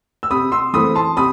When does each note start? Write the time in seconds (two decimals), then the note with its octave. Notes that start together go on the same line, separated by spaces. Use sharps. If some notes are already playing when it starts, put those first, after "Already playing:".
0.23 E6
0.30 C3 B5 D#6
0.52 C6 E6
0.73 E3 A3 C4 B5 D#6
0.95 A5 C6
1.17 C3 B5 D#6